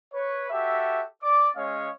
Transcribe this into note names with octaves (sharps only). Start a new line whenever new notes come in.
B4 C#5
F#4 G4 A4 E5
D5 D6
G#3 C#4 C#5 D#5 F5